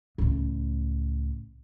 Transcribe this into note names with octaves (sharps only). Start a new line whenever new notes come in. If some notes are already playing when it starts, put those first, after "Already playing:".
C#2 A2